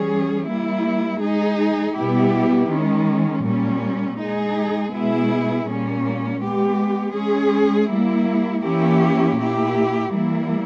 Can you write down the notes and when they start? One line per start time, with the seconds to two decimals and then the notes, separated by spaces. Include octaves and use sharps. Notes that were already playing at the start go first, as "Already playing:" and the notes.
Already playing: E3 G3 C#4 G#4
0.47 G3 A#3 E4
1.21 G#3 D#4 G#4
1.95 B2 G3 B3 E4 G4
2.69 D#3 G#3 C#4
3.44 A#2 G3 C#4
4.18 G#3 D#4 G#4
4.92 B2 G#3 B3 E4 G#4
5.66 A#2 G3 A#3 C#4
6.40 G#3 B3 G4
7.15 G#3 C#4 G#4
7.89 G3 A#3 E4
8.63 E3 A#3 C#4 E4 G4
9.38 A#2 A#3 E4 G4
10.12 E3 G3 A#3 E4